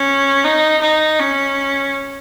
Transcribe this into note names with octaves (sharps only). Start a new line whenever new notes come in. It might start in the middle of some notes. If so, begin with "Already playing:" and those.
Already playing: C#4
D#4
D#4
C#4